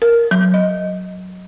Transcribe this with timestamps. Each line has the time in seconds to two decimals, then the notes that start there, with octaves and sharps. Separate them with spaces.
0.02 A#4
0.31 F#3
0.54 D#5